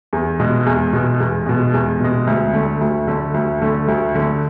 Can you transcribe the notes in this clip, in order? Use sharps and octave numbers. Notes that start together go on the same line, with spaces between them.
E2
B2 G#3
E2
B2 G#3
E2
B2 G#3
E2
B2 G#3
D2
D3 A3
D2
D3 A3
D2
D3 A3
D2
D3 A3